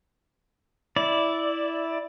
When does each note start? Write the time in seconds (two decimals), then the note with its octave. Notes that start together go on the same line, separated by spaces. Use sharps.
0.96 E4 D5